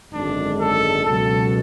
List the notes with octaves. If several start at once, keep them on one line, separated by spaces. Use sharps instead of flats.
G#1 F#2 D3 G#3 D4
A4
C#2 B2 F#3 A4